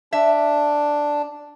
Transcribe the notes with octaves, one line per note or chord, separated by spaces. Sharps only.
D4 E5